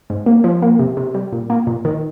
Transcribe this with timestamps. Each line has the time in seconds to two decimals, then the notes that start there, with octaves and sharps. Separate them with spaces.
0.10 G#2
0.26 A#3
0.44 F3
0.62 A#3
0.79 C3
0.97 C3
1.14 G3
1.32 A#2
1.50 A#3
1.67 A#2
1.85 D#3